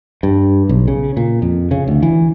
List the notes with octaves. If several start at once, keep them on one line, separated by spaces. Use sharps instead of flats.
G2
B1
C#3
A#2
F2
C#3
D2
E3